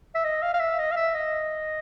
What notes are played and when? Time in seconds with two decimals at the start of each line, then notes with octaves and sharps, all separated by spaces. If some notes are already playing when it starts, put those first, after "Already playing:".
0.15 E5
0.24 D#5
0.42 F5
0.54 F5
0.60 E5
0.78 D#5
0.91 F5
0.96 E5
1.14 D#5